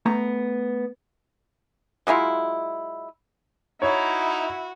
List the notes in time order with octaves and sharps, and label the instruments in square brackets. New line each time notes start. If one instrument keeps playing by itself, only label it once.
[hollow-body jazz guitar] A3 B3 A#5
[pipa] F#3 G#3 E4 F4
[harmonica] D#4 A#5 [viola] E4 [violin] F#4 [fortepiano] C#5